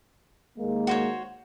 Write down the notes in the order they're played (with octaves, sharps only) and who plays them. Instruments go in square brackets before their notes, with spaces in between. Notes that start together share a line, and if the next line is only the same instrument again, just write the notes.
[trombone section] D#2 G#3 A#3
[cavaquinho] F#4 C5 C#5